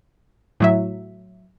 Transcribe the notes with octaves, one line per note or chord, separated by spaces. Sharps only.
A2 F#3 E5